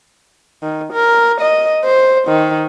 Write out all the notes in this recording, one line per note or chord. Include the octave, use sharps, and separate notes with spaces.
D#3
A#4
D#5
C5
D#3